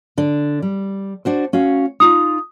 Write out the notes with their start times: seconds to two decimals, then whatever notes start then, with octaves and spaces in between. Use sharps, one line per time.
0.17 D3 D4
0.62 G3
1.25 D4 F#4 C5
1.53 C#4 F#4 F5
2.00 D#4 F4 A#5 D#6